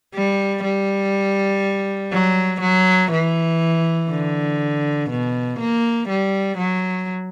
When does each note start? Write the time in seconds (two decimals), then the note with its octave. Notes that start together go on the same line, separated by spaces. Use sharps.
0.15 G3
0.63 G3
2.13 F#3
2.61 F#3
3.12 E3
4.11 D3
5.10 B2
5.60 A#3
6.09 G3
6.58 F#3